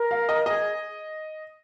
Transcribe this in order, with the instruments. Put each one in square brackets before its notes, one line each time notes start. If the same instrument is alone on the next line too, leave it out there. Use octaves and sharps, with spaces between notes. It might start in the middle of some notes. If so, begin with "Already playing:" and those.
Already playing: [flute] A#4
[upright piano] F5
D#5
[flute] G#4 [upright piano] D#5